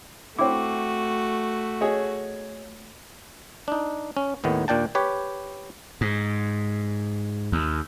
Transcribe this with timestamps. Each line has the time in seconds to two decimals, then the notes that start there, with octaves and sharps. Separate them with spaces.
0.39 A3 C4 E4 F#4 G5 D6
1.81 G#4 C#5 D#5
3.68 D4 D#4
4.17 C#4
4.44 D#2 A2 D#3 B3
4.68 D#2 A#2 D4 G5 A5
4.95 G4 B4 C#5
6.01 G#2
7.52 D#2